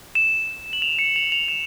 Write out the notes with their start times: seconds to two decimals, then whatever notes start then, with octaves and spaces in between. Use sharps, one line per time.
0.15 E7
0.73 F#7
0.82 F7
0.99 C#7
1.16 F7
1.32 F7
1.48 E7